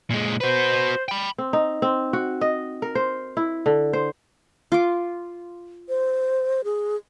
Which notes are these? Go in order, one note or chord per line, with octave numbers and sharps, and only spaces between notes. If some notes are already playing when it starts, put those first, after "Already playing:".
A#2 G#3
F#4 B4 C5
G5 B5
C4
D#4
C4
F#4
D#5
A#4
C5
E4
D3
C5
F4 D6
C5
G#4